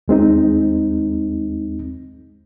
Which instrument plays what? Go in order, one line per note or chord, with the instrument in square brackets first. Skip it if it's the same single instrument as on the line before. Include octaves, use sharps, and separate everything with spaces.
[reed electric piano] D#2 G#3 C4 D#4